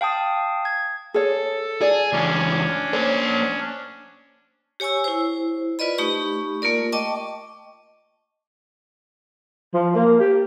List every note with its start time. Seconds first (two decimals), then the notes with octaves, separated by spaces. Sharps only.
0.01 F5 G5 A5 D#6
0.65 G#6
1.14 G#4 A4 C#5
1.81 G#4 D5
2.12 C#2 E3 C#4 D4
2.93 A#3 C5 C#5
4.80 G4 C#5 G#5 C#6 E6
5.04 E4 C5
5.79 F4 B4 D5 D#5 B5
5.98 A3 D#4 G4 B5 C#6
6.62 A3 A#3 F4 A#4 D5
6.92 D#5 G5 A5 C#6 D6
9.73 F3
9.95 A#3
10.20 G4